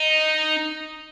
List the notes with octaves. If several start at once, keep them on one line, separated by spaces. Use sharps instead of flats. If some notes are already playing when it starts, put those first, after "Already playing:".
Already playing: D#4